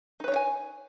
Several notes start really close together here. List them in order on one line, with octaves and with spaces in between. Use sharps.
D#4 B4 C#5 D4 G#5